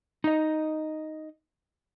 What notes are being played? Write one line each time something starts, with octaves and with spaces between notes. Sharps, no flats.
D#4 D#5